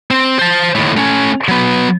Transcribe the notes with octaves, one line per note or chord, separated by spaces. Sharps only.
C4
C5 A5
D#2 A2
A3 C#4
F#3 B3